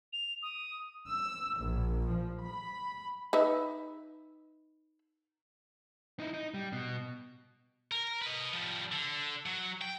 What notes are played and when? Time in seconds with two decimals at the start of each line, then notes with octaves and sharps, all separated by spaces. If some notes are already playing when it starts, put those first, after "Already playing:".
0.13 F7
0.43 D#6
1.10 E6
1.56 A#1
2.09 F3
2.44 B5
3.33 D#4 B4 E5
6.20 D#4 E4
6.34 D#4
6.54 G3
6.73 B2
7.91 A#4
8.22 B4 D#5
8.53 F3 G3
8.92 D3
9.46 F#3
9.81 G5